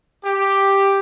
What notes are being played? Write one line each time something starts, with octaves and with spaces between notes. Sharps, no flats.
G4